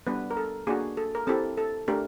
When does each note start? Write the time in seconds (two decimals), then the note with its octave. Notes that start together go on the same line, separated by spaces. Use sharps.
0.07 G3 B3 D4 B4
0.31 A#4
0.37 A4
0.67 A#3 D4 F#4 G#4
0.97 A4
1.15 A#4
1.27 C4 E4 G4 A4
1.57 A4
1.88 A3 D4 G4 A#4